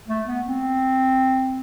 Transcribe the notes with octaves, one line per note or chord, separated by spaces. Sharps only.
A3
B3
C4